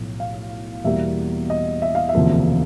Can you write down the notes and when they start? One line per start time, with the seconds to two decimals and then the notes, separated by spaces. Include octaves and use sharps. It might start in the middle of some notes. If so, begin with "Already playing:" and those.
Already playing: B1 A2 F3 A3
0.20 F5
0.85 E2 B2 G3 A#3 E5
1.50 D#5
1.82 E5
1.95 F5
2.09 E5
2.15 E1 D2 C3 F3 A#3